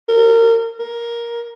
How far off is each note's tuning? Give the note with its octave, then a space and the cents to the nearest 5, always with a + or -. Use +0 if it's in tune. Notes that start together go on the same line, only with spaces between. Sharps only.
A#4 -25
A#4 +10